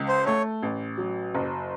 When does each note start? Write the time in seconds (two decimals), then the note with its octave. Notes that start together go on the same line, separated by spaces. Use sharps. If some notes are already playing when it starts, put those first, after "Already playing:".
Already playing: C#2
0.08 C5
0.26 A3 C#5
0.63 A1
0.98 F#3
1.35 F#1